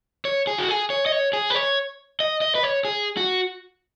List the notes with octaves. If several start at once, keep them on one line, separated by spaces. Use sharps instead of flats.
C#5
G#4
F#4
G#4
C#5
D#5
C#5
G#4
B4
C#5
D#5
D#5
B4
C#5
G#4
F#4